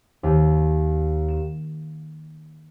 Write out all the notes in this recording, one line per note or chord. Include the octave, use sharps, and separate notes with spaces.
D#2
E7